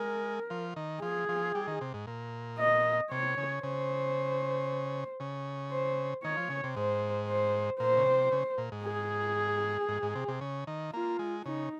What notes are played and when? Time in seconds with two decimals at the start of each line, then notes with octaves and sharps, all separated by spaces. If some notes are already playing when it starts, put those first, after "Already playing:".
Already playing: G#3 A#4
0.50 F3
0.76 D#3
1.02 F3 G#4
1.29 F3
1.55 G3
1.67 D#3
1.81 C3
1.94 G#2
2.07 A#2
2.59 D#5
3.11 C3 C#5
3.37 C#3
3.63 C#3 C5
5.20 C#3
5.72 C5
6.24 D#3 C#5
6.37 F3
6.50 C#3
6.64 C3
6.76 G#2 C5
7.28 C5
7.80 A#2 C5
7.97 C#3
8.06 C3
8.32 C#3
8.58 A#2
8.72 G#2
8.84 G#4
9.89 G#2
10.02 G#2
10.15 C3
10.28 C3
10.41 C#3
10.67 D#3
10.93 A#3 F4
11.19 G#3
11.45 C#3 D#4